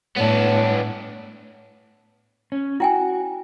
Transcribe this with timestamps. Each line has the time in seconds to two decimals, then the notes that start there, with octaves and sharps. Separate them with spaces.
0.17 A2 B3 D4 C#5
2.52 C#4
2.80 E4 F#4 G5 G#5